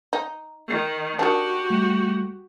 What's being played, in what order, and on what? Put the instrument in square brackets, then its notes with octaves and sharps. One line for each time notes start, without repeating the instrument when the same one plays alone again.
[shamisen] D#4
[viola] D#3
[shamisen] D#3 D4 [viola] F#4 G4
[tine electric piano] G3 A3